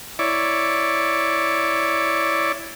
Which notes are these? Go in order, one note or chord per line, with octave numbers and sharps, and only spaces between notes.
E4 C#5 D5